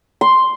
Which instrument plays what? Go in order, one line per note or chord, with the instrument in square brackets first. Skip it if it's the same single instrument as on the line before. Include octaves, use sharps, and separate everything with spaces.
[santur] C6